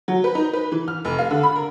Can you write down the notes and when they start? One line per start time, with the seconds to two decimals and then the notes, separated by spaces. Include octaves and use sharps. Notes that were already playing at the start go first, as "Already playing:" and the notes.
0.08 F#3
0.24 B4
0.35 D#4
0.53 B4
0.72 E3
0.88 F6
1.05 F1
1.19 F5
1.30 D3
1.43 B5
1.56 A#4